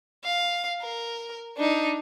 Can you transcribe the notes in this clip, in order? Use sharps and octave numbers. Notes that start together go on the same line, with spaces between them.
F5
A#4
D4 D#4